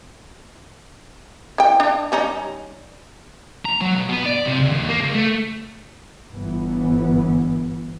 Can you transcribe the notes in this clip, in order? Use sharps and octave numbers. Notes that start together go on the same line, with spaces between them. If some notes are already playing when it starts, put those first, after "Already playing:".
E3 G5
D4
G3 C#4 D#4
A#5
F#3
B2
B3
D5
C3
C#2
D#2
A#3
C#2
A3
G1 E3 B3